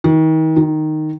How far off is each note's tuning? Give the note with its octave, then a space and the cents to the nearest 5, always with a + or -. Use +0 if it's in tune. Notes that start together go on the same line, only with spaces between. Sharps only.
D#3 +35
D#3 -5